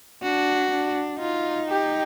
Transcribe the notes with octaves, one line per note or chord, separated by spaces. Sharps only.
D4 F#4
D4
D#4 F4
G4